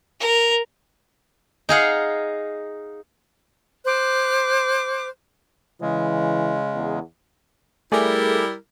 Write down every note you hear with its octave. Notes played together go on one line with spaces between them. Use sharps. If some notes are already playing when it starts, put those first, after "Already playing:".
A#4
D#4 G#4 F5 F#5
C5 D6 F#6
C#3 E3 G#3
E2
G3 A3 E4 G#4 A#4 D5